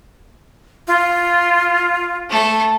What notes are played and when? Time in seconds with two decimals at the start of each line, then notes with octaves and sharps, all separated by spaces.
0.88 F4
2.29 A3 A4